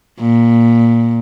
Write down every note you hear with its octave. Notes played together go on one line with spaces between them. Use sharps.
A#2